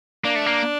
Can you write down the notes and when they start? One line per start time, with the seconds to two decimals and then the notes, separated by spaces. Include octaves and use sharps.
0.24 A#3 D4
0.36 A3
0.46 A#3